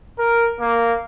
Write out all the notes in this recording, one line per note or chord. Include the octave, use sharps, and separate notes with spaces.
A#4
A#3